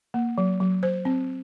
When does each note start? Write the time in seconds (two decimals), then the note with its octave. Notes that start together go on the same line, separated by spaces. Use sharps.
0.14 A#3
0.38 F#3
0.60 F#3
0.83 C5
1.05 C4